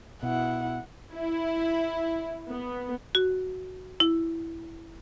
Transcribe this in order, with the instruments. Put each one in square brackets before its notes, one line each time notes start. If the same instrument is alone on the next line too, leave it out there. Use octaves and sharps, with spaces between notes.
[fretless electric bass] B2 [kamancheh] E4 F#5
[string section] E4
B3
[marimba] F#4
E4